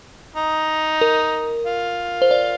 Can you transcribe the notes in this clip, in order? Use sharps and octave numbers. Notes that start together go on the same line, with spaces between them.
D#4
A#4
F4
C5
D5